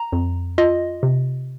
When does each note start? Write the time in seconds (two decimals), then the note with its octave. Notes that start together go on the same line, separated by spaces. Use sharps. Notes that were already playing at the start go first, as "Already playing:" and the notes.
Already playing: A#5
0.12 F2
0.58 F4 D#5
1.03 C3